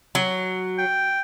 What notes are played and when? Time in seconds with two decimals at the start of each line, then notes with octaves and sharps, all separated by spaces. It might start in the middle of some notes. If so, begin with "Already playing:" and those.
0.15 F#3
0.78 G5